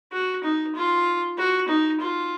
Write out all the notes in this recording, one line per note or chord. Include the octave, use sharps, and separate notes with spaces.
F#4
D#4
F4
F#4
D#4
F4